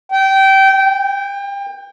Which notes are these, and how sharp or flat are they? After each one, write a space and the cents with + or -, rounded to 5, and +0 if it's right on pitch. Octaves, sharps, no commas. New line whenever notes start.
G5 -20
G5 +30